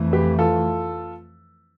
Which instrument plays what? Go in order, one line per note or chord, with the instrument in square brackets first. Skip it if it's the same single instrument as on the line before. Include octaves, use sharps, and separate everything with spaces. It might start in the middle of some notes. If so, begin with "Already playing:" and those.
Already playing: [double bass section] F2 E3 A3
[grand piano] G4 B4
F4 A4